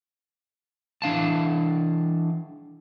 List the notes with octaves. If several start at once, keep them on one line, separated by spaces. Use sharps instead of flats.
E3 D4 F5 A5